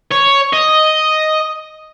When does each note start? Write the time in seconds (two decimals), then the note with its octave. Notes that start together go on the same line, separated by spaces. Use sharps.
0.12 C#5
0.53 D#5